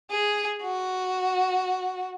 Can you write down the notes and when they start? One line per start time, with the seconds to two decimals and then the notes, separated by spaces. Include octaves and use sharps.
0.10 G#4
0.62 F#4